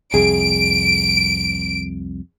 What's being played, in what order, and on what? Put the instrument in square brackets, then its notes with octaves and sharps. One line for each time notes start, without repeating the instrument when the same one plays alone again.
[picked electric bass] C2 F2 [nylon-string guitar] G#4 [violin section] D7